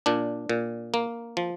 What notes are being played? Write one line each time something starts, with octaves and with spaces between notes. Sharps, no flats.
A#2 D4
A#2
A#3
F3